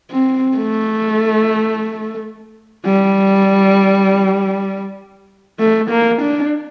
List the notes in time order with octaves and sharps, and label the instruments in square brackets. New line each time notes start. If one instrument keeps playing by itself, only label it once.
[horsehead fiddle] C4
A3
G3
A3
A#3
D4